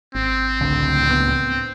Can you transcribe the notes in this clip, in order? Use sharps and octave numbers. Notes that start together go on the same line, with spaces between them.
G#1 C4
C#2 A2 D3 D4
B3